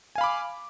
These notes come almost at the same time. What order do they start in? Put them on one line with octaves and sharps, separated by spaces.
G#5 F5 B5 D6